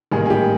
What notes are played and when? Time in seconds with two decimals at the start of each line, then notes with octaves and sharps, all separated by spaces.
0.12 A1 G#2 D#3 G3 A#3 G#4
0.26 G#4
0.30 G4